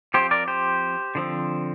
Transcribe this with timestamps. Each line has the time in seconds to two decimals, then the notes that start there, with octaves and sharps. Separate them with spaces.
0.14 F3 C4 G4 C5
0.31 A#4 D5
0.48 G4 C5
1.15 D3 F3 C4